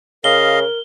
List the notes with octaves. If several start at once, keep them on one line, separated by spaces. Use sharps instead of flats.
C#3 A#4 D#5 F5 G7